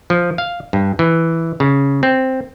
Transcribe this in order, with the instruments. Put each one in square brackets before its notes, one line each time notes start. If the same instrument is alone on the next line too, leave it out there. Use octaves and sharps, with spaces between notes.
[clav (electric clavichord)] F3
F5
G2
E3
C#3
C4